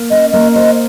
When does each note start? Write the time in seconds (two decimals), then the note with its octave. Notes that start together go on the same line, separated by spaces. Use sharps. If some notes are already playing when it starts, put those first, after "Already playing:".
Already playing: A#3
0.10 C#4 D#5
0.32 A#3 D#5
0.55 C5 D#5